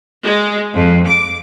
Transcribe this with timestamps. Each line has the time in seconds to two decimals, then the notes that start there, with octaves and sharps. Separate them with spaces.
0.23 G#3
0.75 F2
1.08 D6